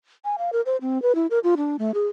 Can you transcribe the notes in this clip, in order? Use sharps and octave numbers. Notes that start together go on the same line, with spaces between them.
G#5
F5
A#4
C5
C4
B4
E4
A#4
F4
D4
A3
G#4